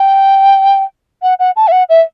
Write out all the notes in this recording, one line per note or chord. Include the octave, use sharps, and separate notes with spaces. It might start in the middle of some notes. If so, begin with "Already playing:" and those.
Already playing: G5
F#5
F#5
A5
E5
F#5
E5